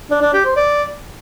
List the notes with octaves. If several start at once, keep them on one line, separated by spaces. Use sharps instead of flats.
D4
D4
G4
C5
D5